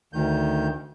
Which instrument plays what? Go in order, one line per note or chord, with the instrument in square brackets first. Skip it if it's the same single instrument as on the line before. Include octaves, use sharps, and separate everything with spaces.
[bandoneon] D2 D#3 G6